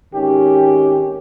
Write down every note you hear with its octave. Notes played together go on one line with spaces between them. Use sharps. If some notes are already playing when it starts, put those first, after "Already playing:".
G#1 D#3 C#4 G4